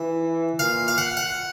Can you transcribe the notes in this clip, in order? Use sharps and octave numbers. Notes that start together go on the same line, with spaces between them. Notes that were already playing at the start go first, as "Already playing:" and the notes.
Already playing: E3 E5
A#2 F5
F5
F#5
F#5